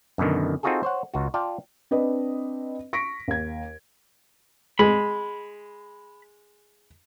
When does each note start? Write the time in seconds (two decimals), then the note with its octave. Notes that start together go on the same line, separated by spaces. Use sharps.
0.18 F#2 B2 D3 D#3
0.63 C4 D#4 F4 F#4 G#4 A4
0.83 C5 C#5 F#5
1.14 C#2 F4 F#4
1.34 F4 D5 F5 G5 A5
1.91 C4 D4 B4 D#5
2.93 C#6 A#6 B6 D7
3.28 D#2 G#6
4.79 G#3 B5